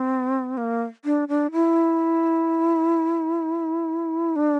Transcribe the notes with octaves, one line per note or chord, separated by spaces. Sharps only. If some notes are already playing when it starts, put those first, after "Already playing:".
Already playing: C4
A#3
D4
D4
E4
D4